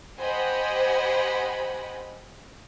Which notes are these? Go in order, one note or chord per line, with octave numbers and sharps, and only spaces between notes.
G4 C5 D#5 F#5 G#5 B5